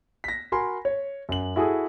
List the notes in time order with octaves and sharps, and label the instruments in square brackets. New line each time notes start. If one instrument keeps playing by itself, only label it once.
[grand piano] A#6 B6
F#4 A#4 G#5 B5 C6
C#5
F#2 F#7
E4 F#4 G#4 A4 D#6